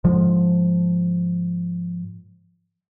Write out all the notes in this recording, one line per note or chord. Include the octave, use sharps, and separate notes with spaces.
G#2 D3 F3 G#3